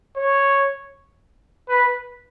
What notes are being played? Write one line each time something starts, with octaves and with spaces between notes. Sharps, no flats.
C#5
B4